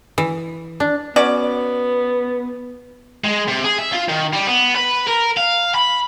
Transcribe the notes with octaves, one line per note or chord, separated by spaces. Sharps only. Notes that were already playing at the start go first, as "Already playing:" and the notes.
E3
D4
B3 C#4 F#4 D5
G#3
C3
G#4
E5
F4
D#3
G3
B3
B4
A#4
F5
B5